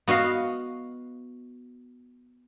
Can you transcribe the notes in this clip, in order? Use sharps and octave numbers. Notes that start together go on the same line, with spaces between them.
B3 F#4 D#5 F5